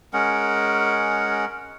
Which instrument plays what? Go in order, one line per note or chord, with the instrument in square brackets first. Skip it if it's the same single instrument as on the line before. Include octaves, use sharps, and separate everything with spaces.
[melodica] G#3 C#4 A#4 F#5